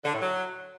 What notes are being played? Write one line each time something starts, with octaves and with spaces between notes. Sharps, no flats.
D3
A2
F#3